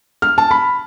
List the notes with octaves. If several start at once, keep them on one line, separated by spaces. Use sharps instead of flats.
F6
A5
B5